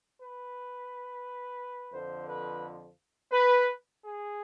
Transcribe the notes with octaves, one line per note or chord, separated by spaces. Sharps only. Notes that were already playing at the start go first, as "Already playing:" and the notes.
B4
F2 D3 F3 C5
B4
B4
G#4